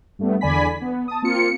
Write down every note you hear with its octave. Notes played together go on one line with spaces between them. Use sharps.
G2 A3 B3
E2 D3 D5 G#5 B5 B6
B3
A5 D#6
A#3 C4 F4 C#7